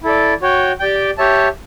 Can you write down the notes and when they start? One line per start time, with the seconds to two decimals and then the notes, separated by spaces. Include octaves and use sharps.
0.03 E4 A4 D5
0.42 F#4 C#5 G5
0.80 G4 D5 G5
1.18 G4 C#5 E5 A5